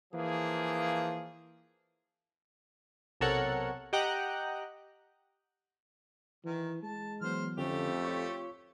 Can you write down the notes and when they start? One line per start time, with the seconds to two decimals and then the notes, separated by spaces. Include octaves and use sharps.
0.13 E3 F3 A#3 G#4
3.20 B1 C3 A4 A#4 C#5 F#5
3.93 G4 D#5 F#5 G5 A#5 F#6
6.45 D#3 E3
6.83 G#3 A5
7.21 E3 F#3 B3 C5 F6
7.58 F2 D3 A3 C4 C#4 G4
8.05 F4 C#5 C#6